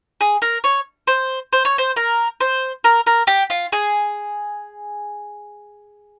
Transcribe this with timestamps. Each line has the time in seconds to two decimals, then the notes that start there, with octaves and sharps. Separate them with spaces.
0.21 G#4
0.42 A#4
0.64 C#5
1.07 C5
1.53 C5
1.65 C#5
1.78 C5
1.96 A#4
2.40 C5
2.84 A#4
3.06 A#4
3.27 G4
3.50 F4
3.72 G#4